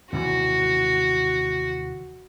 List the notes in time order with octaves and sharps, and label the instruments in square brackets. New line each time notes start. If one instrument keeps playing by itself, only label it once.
[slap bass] D#2 C3 E3 [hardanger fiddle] F#4